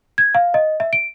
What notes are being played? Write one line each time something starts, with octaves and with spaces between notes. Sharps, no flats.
G#6
F5
D#5
E5
D7